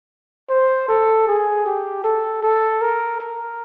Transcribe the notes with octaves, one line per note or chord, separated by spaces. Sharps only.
C5
A4
G#4
G4
A4
A4
A#4
A#4